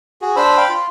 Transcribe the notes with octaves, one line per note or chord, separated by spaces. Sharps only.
F#4 G#4
D4 C5 B5 E6
F5 G5 B5
F4